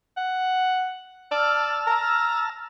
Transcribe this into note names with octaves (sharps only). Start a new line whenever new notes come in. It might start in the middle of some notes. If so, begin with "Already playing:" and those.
F#5
D5 A5 E6 F6
A#5